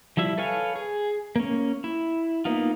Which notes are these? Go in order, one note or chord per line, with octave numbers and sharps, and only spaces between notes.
F3 G3 E4 E5
A4 B4 C#5 F5 G#5
G#4
A#3 C#4
E4
A#3 B3 D#4 F4